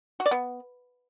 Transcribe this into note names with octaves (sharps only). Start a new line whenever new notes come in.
F#4
D5
B3